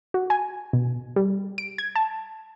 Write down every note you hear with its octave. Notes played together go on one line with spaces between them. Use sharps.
F#4
G#5
B2
G3
D7
G#6
A5